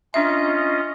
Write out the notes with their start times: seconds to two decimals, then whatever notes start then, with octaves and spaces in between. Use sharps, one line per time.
0.14 C#4 D4 F4 D#5 E5